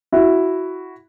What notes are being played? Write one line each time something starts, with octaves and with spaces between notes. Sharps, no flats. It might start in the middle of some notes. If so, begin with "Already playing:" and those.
E4 F#4